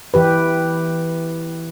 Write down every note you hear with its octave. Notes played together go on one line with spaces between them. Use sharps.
E3 G4 B4